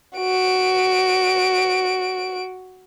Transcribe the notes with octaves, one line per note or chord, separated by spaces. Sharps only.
F#4 D7